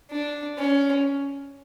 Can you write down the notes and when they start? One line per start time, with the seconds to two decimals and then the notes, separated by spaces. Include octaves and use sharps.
0.11 D4
0.58 C#4